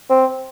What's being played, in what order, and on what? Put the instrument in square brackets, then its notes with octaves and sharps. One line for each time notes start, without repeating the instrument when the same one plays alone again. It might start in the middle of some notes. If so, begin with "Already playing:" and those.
[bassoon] C4